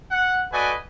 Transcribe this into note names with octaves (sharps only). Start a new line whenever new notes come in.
F#5
A3 F#4 B4 D5 D#5 G#5